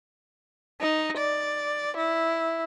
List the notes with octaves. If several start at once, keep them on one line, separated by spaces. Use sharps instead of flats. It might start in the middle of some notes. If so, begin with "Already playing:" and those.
D#4
D5
E4